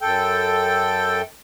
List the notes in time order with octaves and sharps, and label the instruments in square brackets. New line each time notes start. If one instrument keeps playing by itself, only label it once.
[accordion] F#2 A4 G5